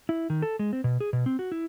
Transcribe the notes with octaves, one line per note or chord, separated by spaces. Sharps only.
E4
D#3
A4
G#3
C4
B2
G#4
B2
C4
F#4
E4